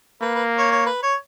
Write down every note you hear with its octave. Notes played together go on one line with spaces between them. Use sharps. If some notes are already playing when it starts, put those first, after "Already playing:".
A#3 B4
B4
C#5
C#5
B4
C#5